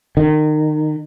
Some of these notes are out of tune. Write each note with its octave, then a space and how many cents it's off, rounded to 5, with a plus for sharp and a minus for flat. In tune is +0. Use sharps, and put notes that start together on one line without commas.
D#3 -25